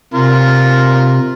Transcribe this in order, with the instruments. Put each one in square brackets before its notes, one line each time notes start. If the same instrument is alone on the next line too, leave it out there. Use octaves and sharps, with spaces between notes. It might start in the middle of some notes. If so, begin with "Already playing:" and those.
[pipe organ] C3 [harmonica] F4 A#4